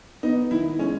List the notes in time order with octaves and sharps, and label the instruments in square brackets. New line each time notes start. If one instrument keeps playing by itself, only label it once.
[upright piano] B3 [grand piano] D#4
[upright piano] D#3 [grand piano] E4
[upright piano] G#3 [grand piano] C#4